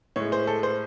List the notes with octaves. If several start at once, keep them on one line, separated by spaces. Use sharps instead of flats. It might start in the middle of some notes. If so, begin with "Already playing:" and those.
A2 G#3 C#5
C5
A4
C5